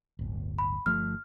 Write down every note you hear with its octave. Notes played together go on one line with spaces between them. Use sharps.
D1 G1
B5
G1 F3 A3 F6